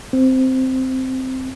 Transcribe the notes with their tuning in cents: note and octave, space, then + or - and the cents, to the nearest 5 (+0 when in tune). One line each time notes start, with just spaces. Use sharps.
C4 -5